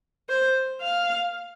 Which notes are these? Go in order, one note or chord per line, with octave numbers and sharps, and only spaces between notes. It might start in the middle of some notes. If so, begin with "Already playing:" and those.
C5
F5